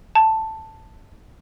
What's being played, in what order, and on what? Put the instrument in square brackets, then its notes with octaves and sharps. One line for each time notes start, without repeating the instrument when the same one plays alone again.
[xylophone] A5